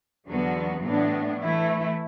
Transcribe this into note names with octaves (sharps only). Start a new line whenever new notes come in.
E2 D3 F#3 B3 F#4
A2 E3 B3 D4
E3 A3 E4